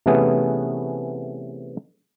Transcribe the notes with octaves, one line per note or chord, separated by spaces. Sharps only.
C3 E3 A3 B3 C#4 G#4